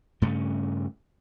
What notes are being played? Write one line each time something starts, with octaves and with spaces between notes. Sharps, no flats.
G2 C#3 A3 C#4